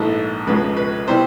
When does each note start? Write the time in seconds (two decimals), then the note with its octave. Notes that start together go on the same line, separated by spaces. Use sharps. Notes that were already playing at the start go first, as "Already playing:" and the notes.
Already playing: A#1 G#2 E3 A3
0.47 C#2 C#3 F3 G#3 B4
0.77 B4
1.08 C3 E3 G3 B3 C5